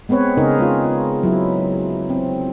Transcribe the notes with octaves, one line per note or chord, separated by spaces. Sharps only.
G#3 B3 C4 B4 C#5
C#3 D#4 G#4 A#4
G#3 F4
F#3 E4
C4